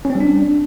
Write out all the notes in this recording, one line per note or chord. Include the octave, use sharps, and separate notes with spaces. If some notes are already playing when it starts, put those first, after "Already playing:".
C#4
C4
G3
D4